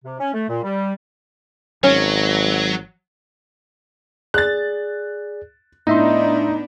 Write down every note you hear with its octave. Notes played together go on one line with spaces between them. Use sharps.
C3
C#4
A3
A#2
G3
G#1 F#3 C#4
G#4 D5 F#6 A6
A2 B3 D4 D#4 D#5 E5 C6